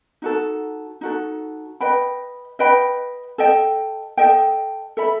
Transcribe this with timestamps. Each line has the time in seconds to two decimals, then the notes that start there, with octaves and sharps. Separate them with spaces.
0.22 D#4 F#4 A4
1.01 D#4 F#4 A4
1.80 B4 D#5 G5 B5
2.59 B4 D#5 G5 B5
3.38 A4 D#5 G5
4.17 A4 D#5 G5
4.97 A4 E5 B5